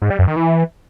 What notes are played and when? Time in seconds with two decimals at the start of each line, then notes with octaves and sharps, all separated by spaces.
0.02 G#2
0.10 G3
0.19 F#2
0.28 D#3
0.36 E3